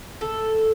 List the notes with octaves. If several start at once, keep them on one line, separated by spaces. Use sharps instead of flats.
A4